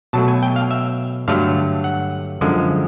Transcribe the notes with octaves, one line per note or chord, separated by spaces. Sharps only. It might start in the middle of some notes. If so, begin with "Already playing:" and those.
B2 F#3 A3 A5
G#5
G5
F5
E5
G2 D3 F#3 A3 F5
F#5
F#2 D3 F3 G#3